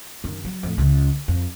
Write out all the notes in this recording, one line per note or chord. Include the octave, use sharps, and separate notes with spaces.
F#2 D#3
F#3
F2 A2
C#2 C#3
F2